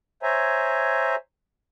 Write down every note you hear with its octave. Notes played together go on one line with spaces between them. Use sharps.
C5 C#5 E5 G#5 A#5